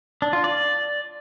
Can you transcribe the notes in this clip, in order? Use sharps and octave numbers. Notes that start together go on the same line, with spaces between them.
D4
F4
D5